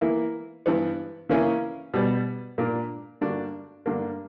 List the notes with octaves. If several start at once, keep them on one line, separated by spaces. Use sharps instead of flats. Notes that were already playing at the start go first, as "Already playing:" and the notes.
E3 A#3 E4
G2 E3 B3
C#3 E3 A#3 C#4 E4
B2 G3 B3
A#2 A#3 D4 A#4
G2 D3 A#3 D4 F#4
G2 D3 A#3 D4